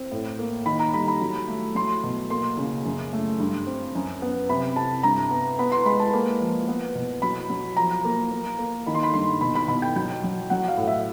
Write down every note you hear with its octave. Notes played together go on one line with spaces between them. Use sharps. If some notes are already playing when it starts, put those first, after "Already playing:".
Already playing: C4
A2
A#3
D#3 B5
A#5
G3 B5
B5
F#3
A3
F#3 C6
B2
A#3 C6
C#3
F#2
A3
G2
C4
F#2
B3
C3 B5
C3 A5
G2 A#5
B3
B3 B5
C6
G#3 B5
A5
A#3
F3
B3
B2
F#3 B5
F#3
F3 A#5
A#3
A#3
A#3
D#3 B5
C6
B5
G2 C6
B2 B5
B5
B2 B5
G5
F#3 G5
F#3
F#3 F#5
F5
A2
E5